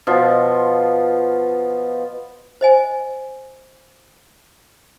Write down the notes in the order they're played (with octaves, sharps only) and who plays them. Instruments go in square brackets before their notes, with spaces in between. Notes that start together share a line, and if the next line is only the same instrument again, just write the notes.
[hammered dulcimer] B2 F3 F4
[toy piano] C5 D#5 G#5